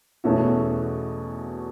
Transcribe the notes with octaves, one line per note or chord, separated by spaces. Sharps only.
E2 B2 A3 C#4 F#4